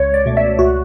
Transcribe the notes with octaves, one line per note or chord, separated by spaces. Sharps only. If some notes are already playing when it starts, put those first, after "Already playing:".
Already playing: C#2 C#5
D5
B2 A3
E5
C#2 F#4